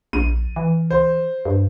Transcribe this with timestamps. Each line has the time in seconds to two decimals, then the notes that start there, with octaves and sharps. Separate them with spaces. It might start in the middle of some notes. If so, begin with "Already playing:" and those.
0.13 A#1 D#7
0.56 E3
0.91 C5
1.45 G2